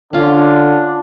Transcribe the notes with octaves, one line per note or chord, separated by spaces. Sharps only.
D3 C#4 D4 F4